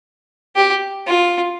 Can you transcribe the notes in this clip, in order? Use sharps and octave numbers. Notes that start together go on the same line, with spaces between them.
G4
F4